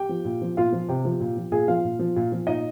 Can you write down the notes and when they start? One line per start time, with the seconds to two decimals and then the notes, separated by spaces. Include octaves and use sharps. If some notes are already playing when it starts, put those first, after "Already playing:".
Already playing: G4 G5
0.09 F3
0.25 A#2
0.42 F3
0.57 A#2 F4 F5
0.73 F3
0.89 C3 G4 G5
1.05 F3
1.20 A#2
1.37 F3
1.52 A#2 G#4 G#5
1.68 F3 F4 F5
1.85 A#2
1.99 F3
2.16 A#2
2.32 F3
2.47 A#2 D#4 D#5